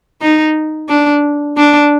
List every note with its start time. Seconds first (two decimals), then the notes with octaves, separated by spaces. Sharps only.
0.21 D#4
0.89 D4
1.57 D4